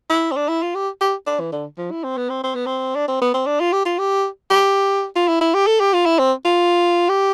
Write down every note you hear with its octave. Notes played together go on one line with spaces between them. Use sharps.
E4
C4
D4
E4
F4
G4
G4
D4
E3
D3
F3
E4
C4
B3
C4
C4
B3
C4
D4
C4
B3
C4
D4
F4
G4
F4
G4
G4
F4
E4
E4
G4
A4
G4
F4
E4
C4
F4
G4